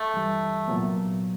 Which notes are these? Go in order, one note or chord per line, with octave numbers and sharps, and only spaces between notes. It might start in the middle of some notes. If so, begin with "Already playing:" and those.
Already playing: A3
G2 E3 G3
C2 A#2 F#3 B3